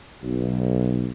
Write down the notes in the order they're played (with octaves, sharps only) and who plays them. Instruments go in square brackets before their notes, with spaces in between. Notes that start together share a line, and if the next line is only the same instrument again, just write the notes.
[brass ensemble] B1